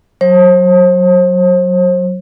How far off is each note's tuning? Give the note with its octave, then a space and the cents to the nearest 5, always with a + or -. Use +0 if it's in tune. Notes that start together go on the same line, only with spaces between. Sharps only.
F#3 +0 C5 +40